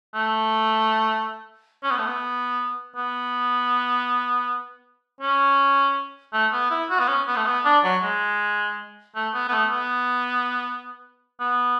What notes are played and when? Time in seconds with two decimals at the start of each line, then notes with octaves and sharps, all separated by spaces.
0.14 A3
1.83 C#4
1.91 B3
1.98 A3
2.06 B3
2.96 B3
5.21 C#4
6.33 A3
6.52 B3
6.71 E4
6.90 F#4
7.00 B3
7.08 C#4
7.27 B3
7.36 A3
7.46 B3
7.65 D4
7.84 F#3
8.02 G#3
9.15 A3
9.34 B3
9.48 B3
9.52 A3
9.71 B3
11.40 B3